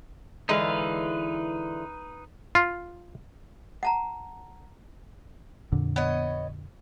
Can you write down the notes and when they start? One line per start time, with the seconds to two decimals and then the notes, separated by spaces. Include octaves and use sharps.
0.49 D3 E3 G#3 D#4 B4 F5
2.55 F4
3.83 F#5 A5 A#5
5.72 F2 A#2 D3
5.96 B3 C#5 D#5